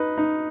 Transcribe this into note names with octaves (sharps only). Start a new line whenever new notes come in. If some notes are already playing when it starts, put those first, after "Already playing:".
Already playing: D#4 B4
D#4